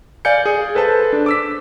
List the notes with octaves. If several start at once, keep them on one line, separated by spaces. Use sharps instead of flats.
D5 F5 G#5 G6 C#7
G#4
A4 B4 C5 A5
D4
D6 E6 B6